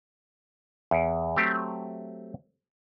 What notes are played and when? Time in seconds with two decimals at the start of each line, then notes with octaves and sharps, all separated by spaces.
0.91 E2
1.36 F#3 A3 C4 G4